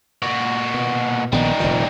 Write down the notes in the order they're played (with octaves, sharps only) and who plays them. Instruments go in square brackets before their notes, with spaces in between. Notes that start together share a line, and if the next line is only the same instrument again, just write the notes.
[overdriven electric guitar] A#2 F#4
[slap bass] B2
[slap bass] A#1 D#3 B3 [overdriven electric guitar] G3 D#4
[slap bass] F1 A#2 D#3